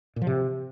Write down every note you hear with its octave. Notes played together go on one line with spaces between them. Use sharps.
A#2
F3
C3